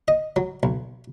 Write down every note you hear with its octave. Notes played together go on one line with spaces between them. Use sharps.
D#5
F#3
B1